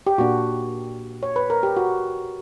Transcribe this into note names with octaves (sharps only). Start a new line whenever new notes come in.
G4
A#2 A#3 D4 F#4
C#5
B4
A#4
G4
F#4